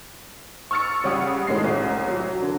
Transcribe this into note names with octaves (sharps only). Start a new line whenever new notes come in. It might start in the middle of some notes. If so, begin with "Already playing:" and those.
C#6 E6 F6 A6 C#7
C#3 G3 F#5 D#6
A2 D#3 G#3 C7
C2
F#3
D3